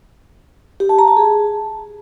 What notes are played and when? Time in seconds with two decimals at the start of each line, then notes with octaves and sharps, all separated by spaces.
0.80 G4
0.89 A5
0.99 A#5
1.08 A5
1.17 G#4